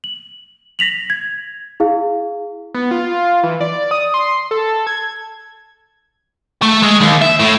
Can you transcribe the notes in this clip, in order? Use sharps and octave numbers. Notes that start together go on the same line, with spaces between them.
F#7
A#6 B6 F7 F#7
G#6
E4 G#4 F5
B3
F4
E3
D5
D#6
C6
A4
G#6
A3
G#3
D#2
E5
A2